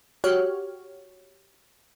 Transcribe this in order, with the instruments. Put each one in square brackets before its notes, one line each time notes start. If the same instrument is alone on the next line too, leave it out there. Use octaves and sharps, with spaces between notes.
[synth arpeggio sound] F#4 G4 C#5 F6